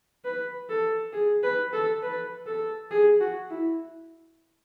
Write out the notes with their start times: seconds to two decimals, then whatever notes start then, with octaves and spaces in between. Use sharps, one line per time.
0.25 B4
0.70 A4
1.13 G#4
1.43 B4
1.73 A4
2.02 B4
2.46 A4
2.91 G#4
3.20 F#4
3.50 E4